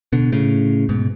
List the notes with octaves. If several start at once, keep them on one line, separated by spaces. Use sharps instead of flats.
B2 D3
A2 C#3
G#2 B2